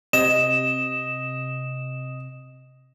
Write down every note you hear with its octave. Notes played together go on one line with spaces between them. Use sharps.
C3 D#5 E7